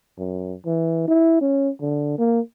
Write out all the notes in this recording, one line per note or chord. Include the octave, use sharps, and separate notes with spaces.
F#2
E3
E4
C#4
D3
A#3